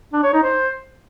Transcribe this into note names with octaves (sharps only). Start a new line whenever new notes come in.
D4
C#5
D#4
C5